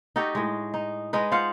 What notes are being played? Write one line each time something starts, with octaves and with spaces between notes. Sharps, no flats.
D#4 F#4 G4 A4
A2 G#3
D#4
G#3 D#4 B4
F4 C5 F5 F#5